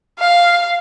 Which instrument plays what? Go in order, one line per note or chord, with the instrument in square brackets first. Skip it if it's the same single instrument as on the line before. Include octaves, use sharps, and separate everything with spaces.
[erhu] F5